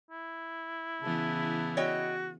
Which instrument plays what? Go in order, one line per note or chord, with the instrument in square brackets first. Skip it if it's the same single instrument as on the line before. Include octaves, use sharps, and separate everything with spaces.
[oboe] E4
[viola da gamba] C#3 E3 B3 [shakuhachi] A5
[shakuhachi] F#4 [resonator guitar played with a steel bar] C#5 D#5 G5